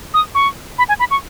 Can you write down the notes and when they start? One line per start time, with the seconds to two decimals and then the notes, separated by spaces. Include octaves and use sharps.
0.14 D#6
0.35 C#6
0.78 B5
0.89 G#5
0.99 B5
1.11 C#6